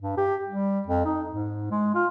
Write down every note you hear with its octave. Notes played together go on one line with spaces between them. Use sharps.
G2
G4
G3
F2
D#4
G#2
G#3
F4